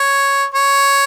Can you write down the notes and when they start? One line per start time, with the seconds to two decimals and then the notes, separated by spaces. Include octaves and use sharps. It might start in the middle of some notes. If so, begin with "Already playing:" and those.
Already playing: C#5
0.54 C#5